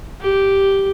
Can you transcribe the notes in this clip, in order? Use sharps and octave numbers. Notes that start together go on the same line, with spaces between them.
G4